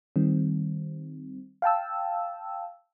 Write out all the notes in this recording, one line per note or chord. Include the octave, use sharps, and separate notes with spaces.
D#3 G3 C4
F5 G5 A5 E6